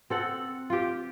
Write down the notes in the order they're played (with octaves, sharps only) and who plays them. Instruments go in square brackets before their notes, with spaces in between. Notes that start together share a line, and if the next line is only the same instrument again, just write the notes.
[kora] C4 A4 F#5
F4 G4